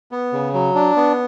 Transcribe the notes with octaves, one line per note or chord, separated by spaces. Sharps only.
B3
C#3
F#3
D4
B3